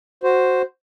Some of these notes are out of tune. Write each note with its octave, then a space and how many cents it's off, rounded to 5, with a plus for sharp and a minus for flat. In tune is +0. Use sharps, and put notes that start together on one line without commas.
F#4 +0 C5 +0